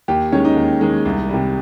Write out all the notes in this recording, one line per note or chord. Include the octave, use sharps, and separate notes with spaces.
D#2 G4
D#3 G#3 C#4
D#4
D#2
D#3 G#3
C2
C3 G3